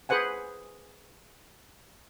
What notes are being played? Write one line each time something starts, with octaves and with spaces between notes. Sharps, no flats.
G#4 B4 C5 F#5 G#5